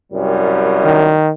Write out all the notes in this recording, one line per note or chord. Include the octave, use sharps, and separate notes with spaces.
C2 F#2 G3
D#3